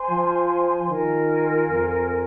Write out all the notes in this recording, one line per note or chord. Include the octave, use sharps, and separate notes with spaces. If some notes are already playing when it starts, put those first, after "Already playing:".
Already playing: C5 G#5 C6
F3
D#3 F4 A#4 G#5
F2